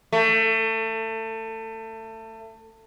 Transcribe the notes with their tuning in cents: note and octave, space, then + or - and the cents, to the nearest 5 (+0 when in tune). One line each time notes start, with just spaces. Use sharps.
A3 +25